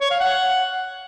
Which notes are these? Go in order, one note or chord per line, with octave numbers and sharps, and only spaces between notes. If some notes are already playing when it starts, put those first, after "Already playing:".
C#5
F5
F#5